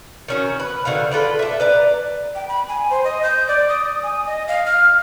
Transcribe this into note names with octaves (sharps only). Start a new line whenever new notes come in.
D#3 C#4 F#4
B4
D3 D#3 F#4 F5
F4 A4 B4 D5
D4 E5
B4 D5 A#5
G5
B5
G#5
C5
D#5
G6
D5
D#6
G#5
D#5
F5
F6